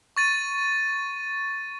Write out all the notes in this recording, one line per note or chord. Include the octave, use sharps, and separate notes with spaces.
C#6 A6 D#7